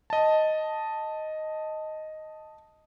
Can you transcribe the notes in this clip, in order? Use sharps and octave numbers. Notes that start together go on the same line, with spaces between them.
D#5 A5